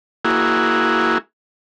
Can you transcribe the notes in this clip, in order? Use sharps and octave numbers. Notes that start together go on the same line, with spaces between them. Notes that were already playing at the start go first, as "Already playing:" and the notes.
A#3 E4 F#4 G#4